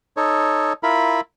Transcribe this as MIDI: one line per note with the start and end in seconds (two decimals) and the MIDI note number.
0.17 0.73 63
0.17 0.73 69
0.17 0.73 73
0.83 1.21 64
0.83 1.21 65
0.83 1.21 70
0.83 1.21 83